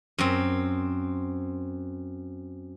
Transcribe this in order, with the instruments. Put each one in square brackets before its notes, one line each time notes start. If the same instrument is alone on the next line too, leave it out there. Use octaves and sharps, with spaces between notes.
[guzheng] F#2 C4